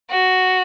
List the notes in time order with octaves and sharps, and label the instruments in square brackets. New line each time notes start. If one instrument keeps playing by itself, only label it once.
[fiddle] F#4